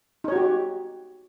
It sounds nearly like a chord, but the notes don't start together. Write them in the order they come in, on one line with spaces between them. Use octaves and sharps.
D#4 C#5 F#4 G4